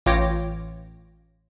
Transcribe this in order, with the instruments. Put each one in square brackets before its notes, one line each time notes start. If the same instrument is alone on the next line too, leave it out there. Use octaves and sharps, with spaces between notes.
[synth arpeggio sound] A1 F4 C#5 G5 D6 A#6